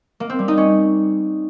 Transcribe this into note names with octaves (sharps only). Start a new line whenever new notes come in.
A#3
C4
G3
D#4
C#4